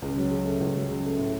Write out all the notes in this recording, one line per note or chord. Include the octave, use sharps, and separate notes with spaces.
C#2
F#3
C#3
A3
C#2
F#3
C#3
A3
A2